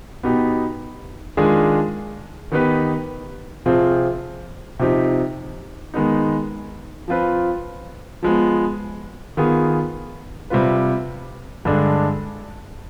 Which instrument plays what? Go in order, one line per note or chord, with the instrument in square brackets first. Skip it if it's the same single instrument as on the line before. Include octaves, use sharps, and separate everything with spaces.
[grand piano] B2 B3 D#4 G4
D#3 G#3 D4 F4 G#4
D#3 B3 D#4 G4 B4
C3 F3 C4 F4 G#4
C3 F3 C4 D#4 G4
D#3 G#3 B3 D#4
F3 C4 F4 B4
F3 G#3 B3
D#3 B3 F4 G#4
C3 G3 C4 F4 B4
G2 D3 G#3 D4